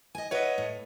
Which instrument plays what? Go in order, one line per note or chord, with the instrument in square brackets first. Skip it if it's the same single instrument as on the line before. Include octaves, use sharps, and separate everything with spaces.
[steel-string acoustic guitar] D#5 G#5
[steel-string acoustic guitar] B4 E5 F#5 [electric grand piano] C#5 D#5
[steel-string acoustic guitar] A2